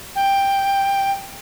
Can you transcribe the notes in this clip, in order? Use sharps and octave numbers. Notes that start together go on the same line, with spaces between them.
G5